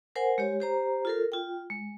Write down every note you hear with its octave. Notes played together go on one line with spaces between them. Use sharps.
A#4 C5 F#5 G#5
G#3 G4 C#5
G4 C5 A#5
F4 A4 A#4
F4 G5
G#3